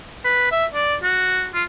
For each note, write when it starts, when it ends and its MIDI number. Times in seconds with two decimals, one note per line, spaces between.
0.25 0.48 71
0.52 0.66 76
0.74 0.96 74
1.03 1.48 66
1.55 1.64 65